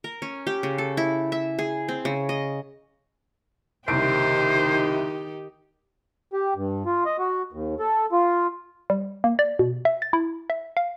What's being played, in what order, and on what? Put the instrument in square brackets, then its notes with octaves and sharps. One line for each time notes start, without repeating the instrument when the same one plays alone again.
[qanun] A#4
C#4
G4
C#3
A4
E4
E5
G#4
C4
C#3
D#5
[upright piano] F#1 C2 D7 [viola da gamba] D#3 D#4 G4 [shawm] C5
[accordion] G4
G2
F4
D#5
F#4
D#2
A4
F4
[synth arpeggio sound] G3
A#3
D5
B2
E5
A6
E4
E5
F5